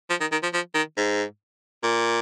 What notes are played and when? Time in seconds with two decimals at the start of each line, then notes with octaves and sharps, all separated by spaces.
0.10 F3
0.21 D#3
0.32 D#3
0.43 F3
0.54 F3
0.75 D#3
0.97 G#2
1.84 A#2